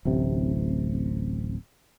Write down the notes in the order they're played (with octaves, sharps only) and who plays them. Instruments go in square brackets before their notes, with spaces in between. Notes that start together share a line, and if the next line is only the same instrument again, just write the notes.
[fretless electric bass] D1 A1 C3